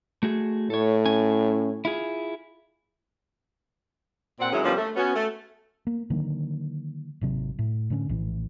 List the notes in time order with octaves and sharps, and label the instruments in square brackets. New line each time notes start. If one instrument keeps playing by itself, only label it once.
[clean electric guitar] A3 F#4 G#4
[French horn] A2 [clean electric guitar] A4 C#5
[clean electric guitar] C#4 G#5
E4 F4 G#4
[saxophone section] A#2 C4 F#5
D#3 F#3 G#3 C#4 E4 G#4
D3 F3 G3 A#3 B3 C#4
A3
B3 C#4 F#4
A3
[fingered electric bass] A#3
D3 D#3 F#3 A#3
G#1 C3 F#3
A2
A2 D3 B3 C#4
A#1 A2 E3